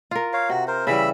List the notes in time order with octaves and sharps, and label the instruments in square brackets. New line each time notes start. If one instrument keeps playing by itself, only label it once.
[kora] F4 A#4
[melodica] C#5 F5
[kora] C3 [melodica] F#4
[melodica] A#4 C5
[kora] C#3 E3 G3 [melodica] E5 B5 E6